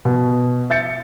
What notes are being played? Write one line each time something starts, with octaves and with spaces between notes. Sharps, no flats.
B2
E5 G6 A6 C#7